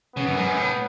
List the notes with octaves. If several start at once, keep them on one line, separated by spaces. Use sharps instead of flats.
C#3 B3
F#2
G#2
F#2
A2